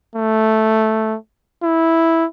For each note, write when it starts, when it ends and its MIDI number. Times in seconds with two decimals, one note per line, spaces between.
0.16 1.16 57
1.63 2.25 64